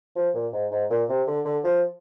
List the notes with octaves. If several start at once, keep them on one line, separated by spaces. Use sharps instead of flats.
F3
A#2
G#2
G#2
A#2
C3
D3
D3
F3